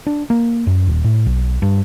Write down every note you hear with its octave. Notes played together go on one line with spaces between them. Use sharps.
D4
A#3
F#2
D#1
A2
B1
G2